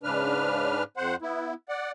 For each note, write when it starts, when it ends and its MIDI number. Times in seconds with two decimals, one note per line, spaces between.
0.03 0.83 44
0.03 0.83 49
0.03 0.83 62
0.03 0.83 71
0.03 0.83 89
0.97 1.16 41
0.97 1.16 72
0.97 1.16 78
1.22 1.54 59
1.22 1.54 64
1.69 1.91 74
1.69 1.91 78